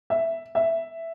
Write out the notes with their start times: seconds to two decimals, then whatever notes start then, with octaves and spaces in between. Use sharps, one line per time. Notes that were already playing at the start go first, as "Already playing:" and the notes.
0.10 E5
0.55 E5